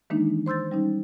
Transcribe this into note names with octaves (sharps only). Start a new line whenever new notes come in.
D#3 E3 G#3 A#3 D4 D#4
C5 C6 E6 G6 A6
G3 C#4 D#4